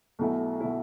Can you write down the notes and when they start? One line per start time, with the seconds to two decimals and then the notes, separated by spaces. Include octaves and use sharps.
0.19 B1 B2 A3 E4
0.60 B2 A3 E4